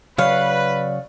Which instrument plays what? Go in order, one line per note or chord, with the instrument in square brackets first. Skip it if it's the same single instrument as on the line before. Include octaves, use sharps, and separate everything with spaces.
[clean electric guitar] C#3 F#3 C#5 [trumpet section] B4 [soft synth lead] D5 [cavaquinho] F5